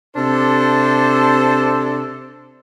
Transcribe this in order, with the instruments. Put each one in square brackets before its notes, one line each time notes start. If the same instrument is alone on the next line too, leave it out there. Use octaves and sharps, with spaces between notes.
[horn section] C3 D4 A4 C5